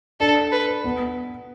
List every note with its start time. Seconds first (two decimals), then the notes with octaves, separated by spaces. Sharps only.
0.20 D4 A4
0.52 B4
0.84 B3